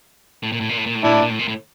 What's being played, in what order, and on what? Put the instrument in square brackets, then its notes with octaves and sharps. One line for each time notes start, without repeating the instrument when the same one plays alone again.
[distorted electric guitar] A2
A#2
A2
A#2
A2
A#2
A2
[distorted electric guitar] A#2 [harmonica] D4 E4
[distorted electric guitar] A2
A#2
A2
A#2
A2